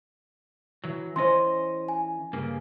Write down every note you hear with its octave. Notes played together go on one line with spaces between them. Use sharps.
E3 F#3
E3 C#4 C5 D#5 C6
G#5
G2 C#3 A#3